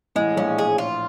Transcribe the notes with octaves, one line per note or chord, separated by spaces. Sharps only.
A1 A2 G#3
A#1 A#2 C#4
G#4
F4